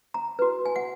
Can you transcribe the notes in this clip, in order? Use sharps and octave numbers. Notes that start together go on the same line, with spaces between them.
A#5
F#4 B4
G#5
F#5